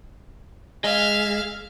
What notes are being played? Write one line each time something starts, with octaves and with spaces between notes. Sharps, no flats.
G#3 E5 F5